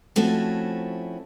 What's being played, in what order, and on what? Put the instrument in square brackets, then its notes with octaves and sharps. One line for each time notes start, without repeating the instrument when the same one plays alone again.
[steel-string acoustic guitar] F3 A3 C4 C#4 E4 F#4